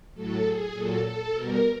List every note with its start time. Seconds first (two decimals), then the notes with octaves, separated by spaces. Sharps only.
0.14 A2 F#3 A4
0.43 G#4
0.73 A#2 F#3 A4
1.03 A4
1.32 B2 G3 A#4